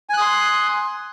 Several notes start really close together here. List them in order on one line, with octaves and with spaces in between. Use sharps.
G#5 F#6 D#6 C6